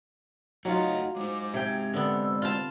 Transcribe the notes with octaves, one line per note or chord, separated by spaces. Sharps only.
F#3 A3 D#4 F4 C#5 D#5 F#5
G#3 D#4 C5 D6
C3 G5 G#6
D3 B3 C5 D5 E6
F4 A5